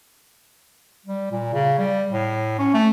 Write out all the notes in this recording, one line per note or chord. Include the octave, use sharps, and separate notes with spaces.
G3
A#2
C#3
G3
A2
C#4
A3